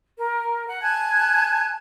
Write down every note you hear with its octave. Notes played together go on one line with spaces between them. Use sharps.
A#4
F#5
G#5 A5 F#6 G#6